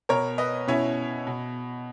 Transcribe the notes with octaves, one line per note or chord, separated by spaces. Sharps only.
B2 A#4 C#5
B4 D#5
B2 C#4 E4
B2